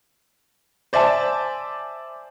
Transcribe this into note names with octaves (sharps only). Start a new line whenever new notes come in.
C5 D5 E5 G#5 A5